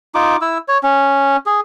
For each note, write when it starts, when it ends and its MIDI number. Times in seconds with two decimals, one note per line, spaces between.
0.15 0.37 63
0.15 0.37 65
0.15 0.37 86
0.41 0.58 64
0.41 0.58 88
0.68 0.78 73
0.83 1.37 61
1.46 1.60 68